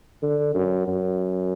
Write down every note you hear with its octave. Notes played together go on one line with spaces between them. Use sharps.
D3
F#2
F#2